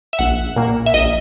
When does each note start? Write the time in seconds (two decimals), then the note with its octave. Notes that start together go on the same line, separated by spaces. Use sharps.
0.13 E5
0.19 A#1 F#5
0.56 A#2 A#3
0.86 E5
0.94 A#1 D#5